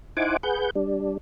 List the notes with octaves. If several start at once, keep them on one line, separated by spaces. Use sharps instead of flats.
D#4 E4 C5 F#5 G#5 D6
G#4 B4 F#5 G6
G3 D4